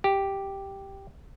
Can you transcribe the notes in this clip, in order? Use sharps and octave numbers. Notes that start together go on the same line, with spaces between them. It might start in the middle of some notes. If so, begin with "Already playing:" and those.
G4